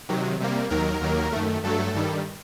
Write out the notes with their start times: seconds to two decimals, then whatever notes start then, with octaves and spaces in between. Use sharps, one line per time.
0.09 C3 D#3 F#3
0.40 C3 G3 A#3
0.70 D#2 D#3 F#3 A#4
1.01 D#2 D#3 F#3 A#3
1.32 F#2 D#3 A3
1.64 G2 F#3 A3 A4
1.94 G2 D#3 G3